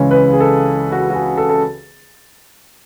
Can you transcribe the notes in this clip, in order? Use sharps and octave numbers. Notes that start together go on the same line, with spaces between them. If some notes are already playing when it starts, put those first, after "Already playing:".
Already playing: C#2 C#3 E3 G#3 C#5
B4
G#4
A4
F#4
F#4
G#4
A4
A4